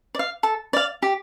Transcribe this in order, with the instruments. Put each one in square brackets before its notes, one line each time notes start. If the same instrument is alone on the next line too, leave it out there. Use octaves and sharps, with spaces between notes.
[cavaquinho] D5
F5
A4
D5 F5
G4